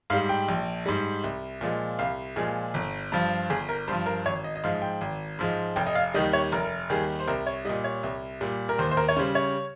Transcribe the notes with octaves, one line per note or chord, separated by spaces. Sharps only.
G#2 G3 F5
G5
A#1
G#2 G3
C2
A#2 F3 G#3
C2 F5
A#2 F3 G#3 G#4
G1
G2 F3
G1 G#4
A#4
G2 F3 C5
A#4
G#1 C#5
D#5
D#5
G#2 F3 G#3 F5
G5
G#1
G#2 F3 G#3
F1 G5
D#5
F5
D#2 D#3 G3 D#5
C#5
F1 A#4
D#2 D#3 G3 G#4
C5
C2 A#4
C#5
A#2 G3 D#5
C#5
C2
A#2 G3
A#4
D#2 C5
C5
A#4
C#5
C#3 G3 C5
C#5